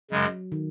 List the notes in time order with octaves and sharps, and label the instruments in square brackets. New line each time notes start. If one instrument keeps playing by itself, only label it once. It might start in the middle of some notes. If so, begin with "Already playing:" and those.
[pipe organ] F#2 C#3 G#3 [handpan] F#3
[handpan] D#3